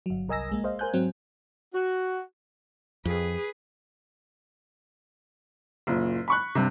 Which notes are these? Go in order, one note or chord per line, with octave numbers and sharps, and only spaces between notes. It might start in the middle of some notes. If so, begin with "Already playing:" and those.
G1 F#3
C2 A#4 D#5 G#5 E6 A#6
A#1 G#3 A#3
G#4 C5 D#5 F5
A#4 C5 G#5 F#6 G6
G#2 F#3 C4
F#4
F2 G#4 B4
F#1 A#2
B5 C#6 F#6
G2 C3